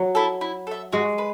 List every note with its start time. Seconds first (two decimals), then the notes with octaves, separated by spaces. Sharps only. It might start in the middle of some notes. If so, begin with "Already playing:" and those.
Already playing: F#3
0.15 E4 A4
0.41 E4
0.67 A4 E5
0.93 G#3 F#4
1.18 B4